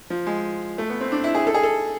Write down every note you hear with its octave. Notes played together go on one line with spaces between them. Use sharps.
F3
G#3
A3
B3
C4
D4
E4
G#4
A4
G#4
A4